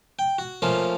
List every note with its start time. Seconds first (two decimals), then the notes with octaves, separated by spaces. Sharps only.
0.19 G5
0.38 F#4
0.62 F3 A3 A#3 C#4 F4